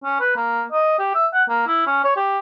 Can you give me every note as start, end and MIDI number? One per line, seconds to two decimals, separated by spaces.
0.04 0.20 61
0.20 0.36 71
0.36 0.63 58
0.72 0.99 75
0.99 1.14 67
1.15 1.26 76
1.34 1.44 78
1.49 1.63 58
1.68 1.86 64
1.87 2.04 61
2.05 2.16 73
2.17 2.39 67